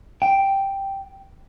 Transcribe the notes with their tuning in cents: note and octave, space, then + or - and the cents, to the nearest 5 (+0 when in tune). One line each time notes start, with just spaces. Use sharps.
G5 +0